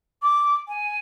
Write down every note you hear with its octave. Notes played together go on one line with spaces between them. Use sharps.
D6
G#5